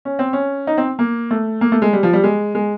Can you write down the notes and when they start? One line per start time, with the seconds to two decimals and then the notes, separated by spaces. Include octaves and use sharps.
0.05 C#4
0.19 C4
0.33 C#4
0.67 D#4
0.78 C4
0.99 A#3
1.31 A3
1.61 A#3
1.72 A3
1.82 G#3
1.93 G3
2.03 F3
2.13 G3
2.24 G#3
2.55 G#3